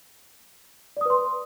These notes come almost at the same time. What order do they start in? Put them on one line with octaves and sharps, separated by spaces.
D5 D#6 B4 C6